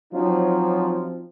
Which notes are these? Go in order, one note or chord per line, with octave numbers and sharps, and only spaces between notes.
F3 F#3 C4 C#4 D#4 F4